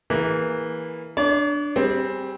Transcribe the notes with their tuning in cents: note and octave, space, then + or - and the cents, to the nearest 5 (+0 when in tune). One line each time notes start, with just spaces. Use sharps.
E3 -15 A#3 +0 G#4 -5
D4 +0 C#5 +45
G3 -10 C4 +0 G#4 -20